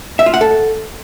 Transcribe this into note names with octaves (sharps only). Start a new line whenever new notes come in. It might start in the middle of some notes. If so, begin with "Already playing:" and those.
E5
F4
F#5
A4